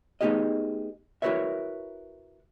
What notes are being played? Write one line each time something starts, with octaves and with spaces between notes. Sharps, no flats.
A3 B3 D#4 G4 G#4 D#5
E4 F#4 A#4 B4 C#5 E5